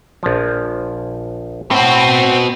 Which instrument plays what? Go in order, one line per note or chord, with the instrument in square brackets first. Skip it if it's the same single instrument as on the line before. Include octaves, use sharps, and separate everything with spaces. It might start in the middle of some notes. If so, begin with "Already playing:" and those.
[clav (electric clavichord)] A#1 F3
[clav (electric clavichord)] A2 [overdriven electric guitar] B3 F#4 [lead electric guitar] C4